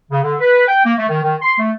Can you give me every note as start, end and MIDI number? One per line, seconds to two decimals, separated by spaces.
0.11 0.19 49
0.23 0.34 50
0.40 0.67 71
0.67 0.81 79
0.84 0.93 58
0.97 1.05 57
1.09 1.20 51
1.22 1.35 51
1.42 1.54 84
1.58 1.70 57